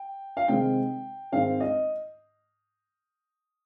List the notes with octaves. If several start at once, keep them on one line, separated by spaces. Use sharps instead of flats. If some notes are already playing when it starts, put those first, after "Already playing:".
Already playing: G5
F5
C3 D#3 G#3 C4 G5
G#2 D#3 G#3 C4 F5
D#5